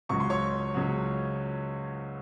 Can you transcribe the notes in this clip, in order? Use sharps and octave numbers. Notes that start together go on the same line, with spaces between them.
C#2 C#3 F#3 C#6
C6
C#5 C#6
C#2 C#3 F#3